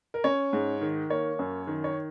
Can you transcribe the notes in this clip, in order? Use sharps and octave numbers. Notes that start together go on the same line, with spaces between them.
A#4
C#4 C#5
G#2
D#3
A#3 C#5
F#2
D#3
C#5